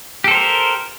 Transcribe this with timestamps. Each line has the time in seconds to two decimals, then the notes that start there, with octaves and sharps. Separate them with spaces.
0.24 G4
0.28 A4
0.31 C5
0.35 A#4